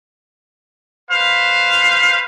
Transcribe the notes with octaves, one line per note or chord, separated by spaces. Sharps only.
B4 C5 F5